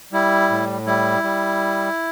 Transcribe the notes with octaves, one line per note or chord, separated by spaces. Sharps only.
G3 E4
A2
G3 E4
G3